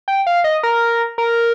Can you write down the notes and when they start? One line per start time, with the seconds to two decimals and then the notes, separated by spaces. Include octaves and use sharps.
0.08 G5
0.27 F5
0.44 D#5
0.63 A#4
1.18 A#4